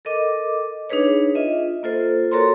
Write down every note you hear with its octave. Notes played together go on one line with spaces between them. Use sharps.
A4 A#4 D#5 D6
D4 D#4 G#4 B4 C#5
F4 D#5 E5
A#3 F4 A4 C5
F#4 A4 A#4 C#5 A#5 C6